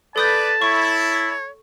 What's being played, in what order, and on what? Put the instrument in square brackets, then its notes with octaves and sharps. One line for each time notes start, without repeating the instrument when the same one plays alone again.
[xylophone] A4 D#6 G6 [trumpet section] B4 [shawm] D5 [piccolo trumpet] A5
[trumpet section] E4 [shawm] C#5 [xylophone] C#6